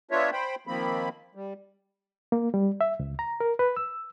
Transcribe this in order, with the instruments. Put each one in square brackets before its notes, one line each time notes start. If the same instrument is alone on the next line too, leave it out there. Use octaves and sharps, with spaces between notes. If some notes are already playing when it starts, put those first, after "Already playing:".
[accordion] B3 D4 F4 C#5 E5
C5 G5 B5
D#3 F3 A#3 C4 B5
G3
[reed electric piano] A#3
G3
E5
C#2
A#5
A#4
B4
E6